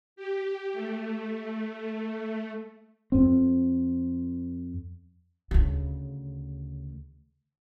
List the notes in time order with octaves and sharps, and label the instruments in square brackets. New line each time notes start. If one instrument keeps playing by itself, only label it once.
[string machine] G4
A3
[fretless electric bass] F2 C4
[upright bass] D2 C#3